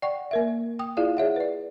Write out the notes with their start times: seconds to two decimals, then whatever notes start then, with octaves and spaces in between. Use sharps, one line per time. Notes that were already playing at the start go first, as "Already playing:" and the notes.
0.02 D5 F#5 G5 C#6
0.31 A#3 A#4 E5
0.79 G5 D#6
0.97 E4 F4 G#4 D5 F5
1.17 G#4 C#5 E5 F#5
1.36 B4 D5